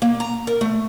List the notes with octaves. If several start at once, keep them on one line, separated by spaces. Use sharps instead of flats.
A#3
A#5
A#4
A3